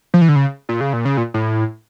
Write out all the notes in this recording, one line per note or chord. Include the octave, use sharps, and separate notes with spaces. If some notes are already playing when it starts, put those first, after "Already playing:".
F3
E3
D3
C#3
A#2
C#3
A#2
C#3
A#2
A2